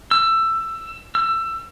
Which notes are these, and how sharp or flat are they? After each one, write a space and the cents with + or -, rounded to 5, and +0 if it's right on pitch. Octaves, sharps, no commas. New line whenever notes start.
E6 +15
E6 +20